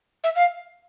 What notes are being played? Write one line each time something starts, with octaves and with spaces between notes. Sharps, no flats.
E5
F5